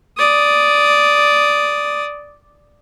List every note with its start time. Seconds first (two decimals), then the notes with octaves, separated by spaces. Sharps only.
0.18 D5 D#6